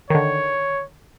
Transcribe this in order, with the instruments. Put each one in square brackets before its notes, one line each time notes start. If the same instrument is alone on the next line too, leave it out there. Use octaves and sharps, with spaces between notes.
[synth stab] D3 D#3 [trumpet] C#5